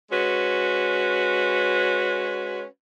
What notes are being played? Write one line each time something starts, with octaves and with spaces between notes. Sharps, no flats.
G#3 C#4 F#4 B4